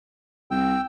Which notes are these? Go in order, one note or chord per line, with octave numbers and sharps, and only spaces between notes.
C2 G5 E6